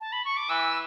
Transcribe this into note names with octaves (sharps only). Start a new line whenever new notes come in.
A5
B5
C#6
D6
E3 E6